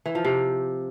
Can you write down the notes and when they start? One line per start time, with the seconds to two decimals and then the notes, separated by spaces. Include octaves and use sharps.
0.06 E3
0.15 F3
0.25 C3